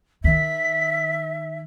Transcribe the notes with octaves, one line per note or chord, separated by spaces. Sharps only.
D#3 E5 B6